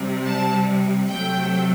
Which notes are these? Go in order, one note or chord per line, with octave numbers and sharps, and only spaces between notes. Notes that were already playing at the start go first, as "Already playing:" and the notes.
Already playing: C3 G3
A5
C3 F#3 A3 G5